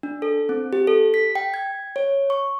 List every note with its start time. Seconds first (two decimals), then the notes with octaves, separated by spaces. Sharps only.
0.03 D4
0.22 A4
0.49 C4
0.73 G4
0.87 A4
1.14 B6
1.35 G5
1.54 G#6
1.96 C#5
2.30 C#6